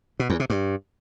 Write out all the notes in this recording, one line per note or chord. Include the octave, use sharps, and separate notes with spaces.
B2
E2
C3
G2